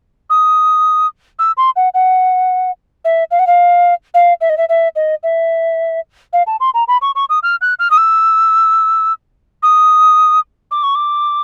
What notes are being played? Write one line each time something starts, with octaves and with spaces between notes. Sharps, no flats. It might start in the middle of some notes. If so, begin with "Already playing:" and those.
D#6
E6
C6
F#5
F#5
E5
F5
F#5
F5
F5
E5
D#5
E5
E5
D#5
E5
F5
A5
C6
A#5
B5
C#6
C#6
D#6
F6
F#6
F6
D#6
E6
D#6
D6
C#6
D6